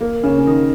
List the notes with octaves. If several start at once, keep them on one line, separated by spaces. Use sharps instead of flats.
A#3
C#3 C#4
C#4
D#3 D#4